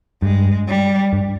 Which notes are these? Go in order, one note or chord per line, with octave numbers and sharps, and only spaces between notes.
G2 G#3
G3
G2